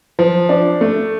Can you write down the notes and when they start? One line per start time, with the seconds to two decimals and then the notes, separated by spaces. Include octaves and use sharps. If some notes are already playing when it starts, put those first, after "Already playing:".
0.19 F3
0.49 D4
0.81 A3